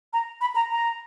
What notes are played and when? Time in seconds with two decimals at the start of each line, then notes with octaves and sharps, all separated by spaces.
0.13 A#5
0.41 B5
0.55 A#5
0.71 A#5